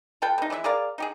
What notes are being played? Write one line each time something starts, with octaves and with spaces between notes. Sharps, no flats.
F4 A4 B4 G5
C3 D#4
E3 G#3 D5 E5
G#4 A#4 D5 F5
D#4 G4 G#4